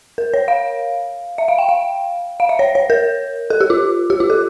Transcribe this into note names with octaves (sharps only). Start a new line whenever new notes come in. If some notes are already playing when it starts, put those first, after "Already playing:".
A#4
C#5
F5
E5
F5
G5
F5
F5
E5
C#5
C#5
A#4
A4
G4
F4
G4
F4
A4